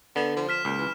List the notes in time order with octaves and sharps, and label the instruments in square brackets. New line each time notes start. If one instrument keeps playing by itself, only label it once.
[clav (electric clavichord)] D3 [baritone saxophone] B3
[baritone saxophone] F3
[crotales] F6 B6 E7
[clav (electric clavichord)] C#2 [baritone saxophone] A#2
[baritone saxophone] E3